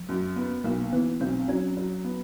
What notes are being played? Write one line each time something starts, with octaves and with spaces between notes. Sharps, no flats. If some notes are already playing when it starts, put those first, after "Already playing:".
Already playing: F3
F#2
B3
B1 A#3
E3 B3
B1 C4
F#3 C#4
F#3
B3